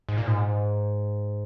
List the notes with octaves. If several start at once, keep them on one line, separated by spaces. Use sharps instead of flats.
G#2
A#2
G#2